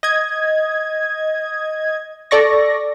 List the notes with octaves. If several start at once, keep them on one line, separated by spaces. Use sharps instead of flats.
D#5 G#6
A4 D5 C#6 A#6